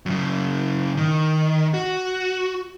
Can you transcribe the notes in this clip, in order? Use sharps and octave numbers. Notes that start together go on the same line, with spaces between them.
F#2 C#3
D#3
F#4